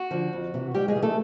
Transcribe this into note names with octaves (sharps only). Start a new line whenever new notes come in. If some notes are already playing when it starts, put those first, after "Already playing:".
Already playing: F#4
D3 F3
F2
C3 E3
G#2 G3 G4
G#3 G#4
E3 G3
A3 A4